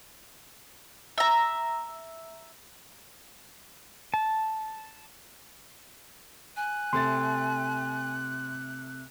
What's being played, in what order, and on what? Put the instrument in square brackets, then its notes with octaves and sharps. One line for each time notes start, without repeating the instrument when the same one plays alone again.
[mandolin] E5 A#5
[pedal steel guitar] A5
[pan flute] G#5 [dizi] F#6
[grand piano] C3 A3 A6 [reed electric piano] C6